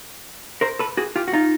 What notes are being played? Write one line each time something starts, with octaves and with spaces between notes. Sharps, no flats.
A#4 C5
A4 B4
F#4 G#4
F4 G4
F#4
D#4 F4